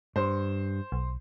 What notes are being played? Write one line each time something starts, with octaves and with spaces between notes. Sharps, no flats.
G2 C5
B1